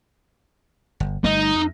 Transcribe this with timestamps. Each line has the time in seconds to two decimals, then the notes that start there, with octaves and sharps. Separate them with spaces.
1.00 G1
1.24 G1 G3 A3 D#4
1.55 F2